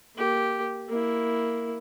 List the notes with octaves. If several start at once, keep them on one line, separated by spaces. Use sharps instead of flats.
A#3 G4
A#3 E4